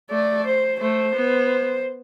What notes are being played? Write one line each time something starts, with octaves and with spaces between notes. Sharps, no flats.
A3 D5
C5
A3 C5
B3